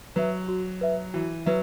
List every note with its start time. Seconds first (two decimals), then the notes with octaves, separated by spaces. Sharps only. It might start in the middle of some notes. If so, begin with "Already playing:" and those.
0.16 F#3 B4 E5
0.48 F#4
0.81 B4 E5
1.14 E3 F#4
1.46 F#3 B4 E5